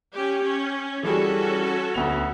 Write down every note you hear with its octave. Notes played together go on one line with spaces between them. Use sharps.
C#4 G4
C#4
E3 G3 C#4 F#4 G#4 A4
D2 B3 F7